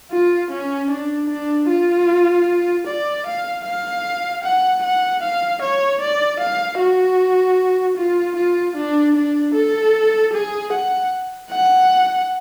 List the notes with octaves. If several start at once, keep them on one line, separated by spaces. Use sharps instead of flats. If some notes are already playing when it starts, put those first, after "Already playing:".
F4
C#4
D4
D4
F4
D5
F5
F5
F#5
F#5
F5
C#5
D5
F5
F#4
F4
F4
D4
D4
A4
G#4
F#5
F#5